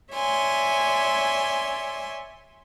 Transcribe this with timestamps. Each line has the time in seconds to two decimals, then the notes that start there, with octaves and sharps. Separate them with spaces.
0.13 C#5 D5 E5 G#5 C6